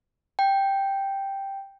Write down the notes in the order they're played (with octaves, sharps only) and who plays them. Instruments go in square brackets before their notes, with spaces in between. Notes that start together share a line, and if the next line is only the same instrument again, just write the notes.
[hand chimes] G5